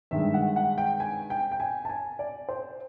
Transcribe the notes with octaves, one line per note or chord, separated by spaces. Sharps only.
G2 D#3 G#3 E5
F#5
F#5
G5
G#5
G5
G5
G#5
A5
G#5
D5
C5